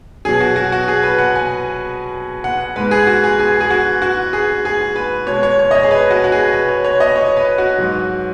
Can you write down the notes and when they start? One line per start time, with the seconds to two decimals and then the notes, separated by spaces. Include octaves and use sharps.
0.25 B2 F#3 G#4
0.40 F#4
0.56 F#4
0.72 F#4
0.88 G#4
1.03 B4
1.19 F#5
1.35 G#5
2.44 F#5
2.76 G#2 G#3 B4
2.91 G#4
3.07 F#4
3.24 G#4
3.40 G#4
3.61 G#4
3.71 F#4
4.02 F#4
4.33 G#4
4.65 G#4
4.96 B4
5.27 B2 G#3 C#5
5.43 C#5
5.59 C#5
5.71 D#5
5.75 C#5
5.83 G#4
5.91 B4
6.11 F#4
6.24 F#4
6.32 G#4
6.53 B4
6.69 C#5
6.84 C#5
7.00 D#5
7.16 C#5
7.37 B4
7.58 F#4
7.78 G#2 F#3